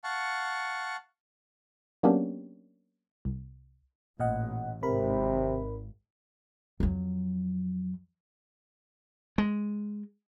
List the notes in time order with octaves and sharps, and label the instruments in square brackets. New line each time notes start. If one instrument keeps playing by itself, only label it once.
[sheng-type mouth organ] F5 F#5 A5 C#6
[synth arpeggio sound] F#3 A#3 B3 C#4 D4 G4
C2
[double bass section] A1 [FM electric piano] A#2 D#5 F#5
[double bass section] G#1 [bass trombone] C3 [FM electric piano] A#4 B5
[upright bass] F2 F#3
[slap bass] G#3